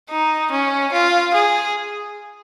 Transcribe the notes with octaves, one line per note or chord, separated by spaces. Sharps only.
D#4
C#4
F4
G#4